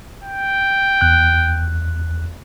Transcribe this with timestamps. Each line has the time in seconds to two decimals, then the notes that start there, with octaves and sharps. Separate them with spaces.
0.24 G5
1.01 E2 F#6